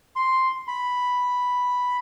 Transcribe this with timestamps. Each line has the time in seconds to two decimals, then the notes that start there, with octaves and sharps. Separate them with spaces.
0.16 C6
0.68 B5